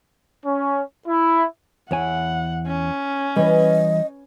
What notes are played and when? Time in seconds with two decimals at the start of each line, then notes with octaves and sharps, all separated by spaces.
0.45 C#4
1.08 E4
1.91 E2 E4 C#5 F#5 G#5
2.67 C#4
3.36 E3 G3 B4 D#5